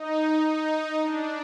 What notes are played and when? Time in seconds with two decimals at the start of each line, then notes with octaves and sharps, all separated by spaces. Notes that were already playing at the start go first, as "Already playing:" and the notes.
Already playing: D#4
0.46 D#4
1.02 D4